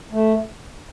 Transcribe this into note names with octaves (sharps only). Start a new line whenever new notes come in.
A3